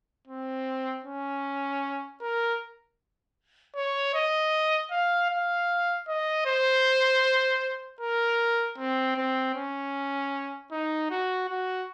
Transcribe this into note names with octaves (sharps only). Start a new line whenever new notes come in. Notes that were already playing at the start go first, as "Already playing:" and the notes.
C4
C#4
A#4
C#5
D#5
F5
F5
D#5
C5
A#4
C4
C4
C#4
D#4
F#4
F#4